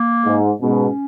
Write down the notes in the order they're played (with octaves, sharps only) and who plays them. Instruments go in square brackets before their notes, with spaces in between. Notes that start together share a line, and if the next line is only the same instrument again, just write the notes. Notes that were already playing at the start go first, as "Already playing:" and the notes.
Already playing: [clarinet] A#3
[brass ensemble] G#2
[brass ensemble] G#2 B2 [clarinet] C#4